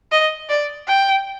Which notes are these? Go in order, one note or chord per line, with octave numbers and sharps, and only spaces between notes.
D#5
D5
G5